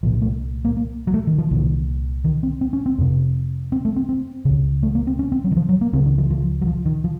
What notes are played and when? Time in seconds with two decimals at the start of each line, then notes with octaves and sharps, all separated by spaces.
0.03 C2 A#2 F3
0.22 A3
0.65 A#3
0.77 A#3
1.07 F#3
1.14 A3
1.27 D#3
1.38 F3
1.51 C2 A#2 D#3
2.24 D#3
2.43 C4
2.61 C4
2.73 C#4
2.86 C4
2.98 F2 C3
3.72 C4
3.85 A3
3.96 C4
4.09 C4
4.45 C#2 C#3
4.83 A3
4.95 A#3
5.07 C4
5.19 C#4
5.32 C4
5.44 F#3
5.51 D#3
5.57 F3
5.69 F#3
5.81 A#3
5.93 C#2 C#3 C4
6.06 D#3
6.18 F3
6.30 F3
6.62 F#3
6.67 F3
6.85 D#3
7.04 F3